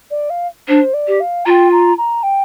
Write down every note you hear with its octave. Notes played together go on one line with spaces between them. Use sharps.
D5
F5
D4 C5
D5
G4
F5
F4 G5 A#5
A#5
A#5
G5